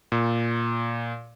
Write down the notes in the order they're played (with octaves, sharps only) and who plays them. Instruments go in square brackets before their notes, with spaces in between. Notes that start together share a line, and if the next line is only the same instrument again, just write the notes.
[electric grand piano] A#2